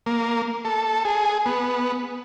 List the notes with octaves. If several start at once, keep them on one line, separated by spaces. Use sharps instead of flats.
A#3
A4
G#4
B3